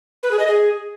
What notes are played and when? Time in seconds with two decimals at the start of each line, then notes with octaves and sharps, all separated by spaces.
0.23 B4
0.31 G#4
0.39 D#5
0.48 G#4